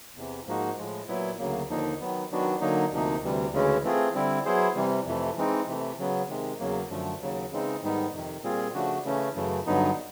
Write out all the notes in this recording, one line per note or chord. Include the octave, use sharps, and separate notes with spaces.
E2 C3 E3
G#2 F3 A#3 D#4 F#4
A2 F3 G#3
A#2 F#3 B3 E4
D2 C#3 F#3 A#3
D#2 D3 F3 A#3 D#4
D#3 F#3 B3
D#3 F#3 B3 D4 F#4
D3 F#3 A#3 D#4
D2 C3 F3 A#3 D#4
D2 C3 E3 G3
D2 C#3 E3 G#3 C#4
E3 A3 C4 F4 G#4
D3 G3 C4 E4
F#3 B3 E4 G#4 C5
C3 E3 G3
F2 C3 E3 A3
E3 G#3 C4 D#4
C3 E3 A3
C#3 F#3 B3
C3 D#3 G#3
E2 C#3 F#3 A#3
F#2 D3 F3 A3
D#2 C#3 F#3
C#3 E3 G#3 C4 D#4
G#2 D#3 G3 B3 D#4
F2 C3 D#3
A#2 G3 C4 F4 G#4
C#3 F3 A3 D4 F#4
C#3 E3 A3 C#4
F#2 C#3 E3 A3
G2 D3 F#3 B3 D#4